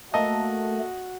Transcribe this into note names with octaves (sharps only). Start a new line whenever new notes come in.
A3 A#3 F#4 A4 D#5